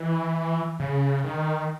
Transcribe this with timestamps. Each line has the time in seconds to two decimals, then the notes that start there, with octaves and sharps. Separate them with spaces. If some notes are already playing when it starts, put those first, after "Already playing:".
Already playing: E3
0.80 C#3
1.24 D#3